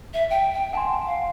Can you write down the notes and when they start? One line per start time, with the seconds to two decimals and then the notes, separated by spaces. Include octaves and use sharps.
0.14 E5
0.30 G5
0.53 G5
0.73 F#5 G#5 A5 C6
1.06 F5